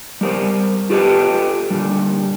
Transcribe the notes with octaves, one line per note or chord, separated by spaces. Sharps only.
G3 A#4 C5
F4 G4 A4 B4 D#5 G5
A#2 D3 G3